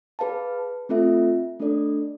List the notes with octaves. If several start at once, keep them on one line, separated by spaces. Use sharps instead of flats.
G#4 B4 F5 A5
A3 C4 F4 A4 E5
A3 D4 A4 D5